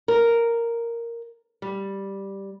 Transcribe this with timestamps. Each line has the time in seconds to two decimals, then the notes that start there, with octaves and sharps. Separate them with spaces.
0.08 A#4
1.62 G3